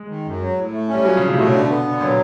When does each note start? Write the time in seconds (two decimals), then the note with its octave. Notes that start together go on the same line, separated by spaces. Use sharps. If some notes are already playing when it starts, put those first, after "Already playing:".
Already playing: G#3
0.08 D#3
0.25 F#2
0.41 F#3
0.56 A2
0.73 A3
0.89 C#4
0.94 G3
1.05 F3 F#3
1.17 C#3
1.21 A2
1.29 C3
1.36 B2 A3
1.52 D3
1.69 B3
1.84 D3
2.01 A#2 F#3